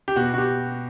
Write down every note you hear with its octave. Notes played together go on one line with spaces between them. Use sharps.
G4
B2 F#4
F#4
G4